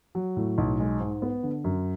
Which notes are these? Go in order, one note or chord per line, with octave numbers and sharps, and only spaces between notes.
F#3
A2
B1
G#3
G#2
B3
D3
F#2